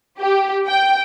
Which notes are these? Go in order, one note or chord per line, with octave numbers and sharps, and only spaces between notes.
G4
G5